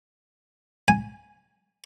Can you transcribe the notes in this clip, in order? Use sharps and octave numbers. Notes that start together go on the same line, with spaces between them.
G#5